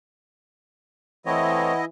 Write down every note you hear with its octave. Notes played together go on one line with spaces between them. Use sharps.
E3 A3 C4 E4 C#5 D#5 F#5